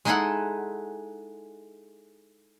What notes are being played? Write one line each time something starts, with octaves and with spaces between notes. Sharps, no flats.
G#3 D#4 E4 G#4 A4 F#5